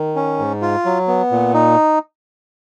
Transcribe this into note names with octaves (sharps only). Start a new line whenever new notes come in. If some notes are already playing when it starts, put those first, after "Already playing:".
Already playing: D#3
C#4
G#2
F4
F#3
B3
A#2
D#4